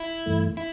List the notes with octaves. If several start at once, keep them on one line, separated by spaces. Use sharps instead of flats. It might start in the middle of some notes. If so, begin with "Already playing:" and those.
Already playing: E4
G2 E3 A3
E4